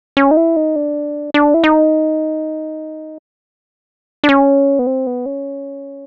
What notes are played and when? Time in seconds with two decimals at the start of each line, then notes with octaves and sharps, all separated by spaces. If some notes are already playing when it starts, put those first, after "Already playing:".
0.17 C#4
0.31 D#4
0.37 E4
0.56 D#4
0.76 D4
1.34 D4
1.54 E4
1.64 D#4
4.24 D4
4.29 C#4
4.79 B3
4.87 C4
5.07 B3
5.26 C#4